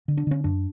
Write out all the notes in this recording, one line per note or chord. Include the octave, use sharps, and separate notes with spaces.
D3
D4
D3 C#4
F#2 D4